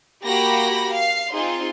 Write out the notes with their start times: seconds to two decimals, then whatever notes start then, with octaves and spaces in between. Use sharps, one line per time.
0.24 A#3 F#4 G4 B5 A#6
0.92 F5 C7
1.33 C4 D#4 F4 G#4 C6